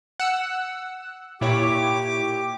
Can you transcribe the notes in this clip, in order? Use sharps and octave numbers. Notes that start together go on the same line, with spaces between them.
F#5 E6
A#2 E4 G4 C#5 D6